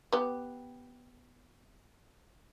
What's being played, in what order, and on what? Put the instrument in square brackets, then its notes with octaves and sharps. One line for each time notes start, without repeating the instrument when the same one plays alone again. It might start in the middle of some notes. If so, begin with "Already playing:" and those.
[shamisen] B3 G4